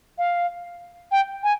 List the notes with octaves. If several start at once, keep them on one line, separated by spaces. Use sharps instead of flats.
F5
G5
G#5